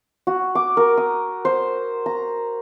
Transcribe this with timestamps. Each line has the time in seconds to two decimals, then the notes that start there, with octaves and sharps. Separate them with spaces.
0.27 F#4
0.55 D6
0.77 A#4
0.97 D#6
1.45 C5
2.06 A#5